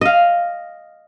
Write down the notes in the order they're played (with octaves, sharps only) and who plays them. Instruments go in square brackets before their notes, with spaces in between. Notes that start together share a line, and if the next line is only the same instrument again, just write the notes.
[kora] D#5 F5